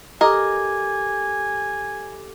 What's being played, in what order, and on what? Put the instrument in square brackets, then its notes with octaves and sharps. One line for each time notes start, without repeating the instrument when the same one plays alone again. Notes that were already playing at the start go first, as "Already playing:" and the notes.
[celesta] G4 A4 D6 [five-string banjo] A#4 D#5 [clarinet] G#5